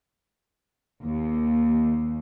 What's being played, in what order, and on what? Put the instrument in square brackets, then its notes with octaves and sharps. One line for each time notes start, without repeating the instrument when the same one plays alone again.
[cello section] D#2